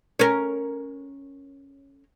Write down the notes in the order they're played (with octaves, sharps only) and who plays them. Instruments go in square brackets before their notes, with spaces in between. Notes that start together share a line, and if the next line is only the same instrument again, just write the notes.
[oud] C#4 A#4